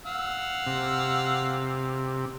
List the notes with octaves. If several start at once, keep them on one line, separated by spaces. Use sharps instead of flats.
F5 F#5 E6
C3